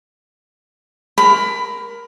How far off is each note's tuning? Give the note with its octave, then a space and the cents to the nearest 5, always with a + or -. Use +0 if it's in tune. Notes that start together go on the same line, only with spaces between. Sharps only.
A#4 +15 B5 +20